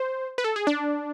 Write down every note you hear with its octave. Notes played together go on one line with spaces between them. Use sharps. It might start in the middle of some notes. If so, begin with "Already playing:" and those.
Already playing: C5
B4
A4
G#4
D4